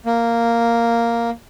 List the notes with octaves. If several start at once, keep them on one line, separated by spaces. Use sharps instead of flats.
A#3